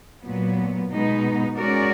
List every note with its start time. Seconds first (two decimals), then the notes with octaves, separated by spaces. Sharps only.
0.24 A#2 F#3 B3
0.91 B2 G#3 B3 D#4
1.58 G#3 C#4 F#4 A#4 D5